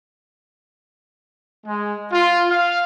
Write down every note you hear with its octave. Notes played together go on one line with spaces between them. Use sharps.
G#3
F4
F5